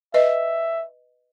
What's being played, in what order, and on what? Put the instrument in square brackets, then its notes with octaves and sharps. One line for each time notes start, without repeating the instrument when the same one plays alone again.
[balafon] B4 D#5 [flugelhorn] E5